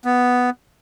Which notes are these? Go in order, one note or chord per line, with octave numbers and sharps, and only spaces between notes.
B3